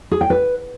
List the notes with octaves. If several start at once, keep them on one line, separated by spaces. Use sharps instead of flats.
G#4
G5
B4